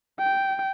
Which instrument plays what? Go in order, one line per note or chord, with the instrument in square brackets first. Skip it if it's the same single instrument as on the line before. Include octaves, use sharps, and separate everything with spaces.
[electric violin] G5